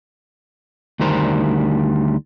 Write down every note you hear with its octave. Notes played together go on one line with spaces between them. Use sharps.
D2 D#3 G3 A#4 C5